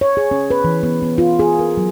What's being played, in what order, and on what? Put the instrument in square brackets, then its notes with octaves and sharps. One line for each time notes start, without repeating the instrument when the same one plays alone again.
[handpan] C#5
G#4
C#4
B4
E3
B3
B3
F4
G#4
A#4
F#3